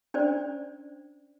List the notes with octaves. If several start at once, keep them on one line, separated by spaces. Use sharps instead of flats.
C#4 D4 C5 D5